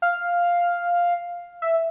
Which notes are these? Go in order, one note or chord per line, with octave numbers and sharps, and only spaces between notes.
F5
E5